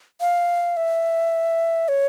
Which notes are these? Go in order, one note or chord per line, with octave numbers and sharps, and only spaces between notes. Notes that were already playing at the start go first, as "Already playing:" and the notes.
F5
E5
C#5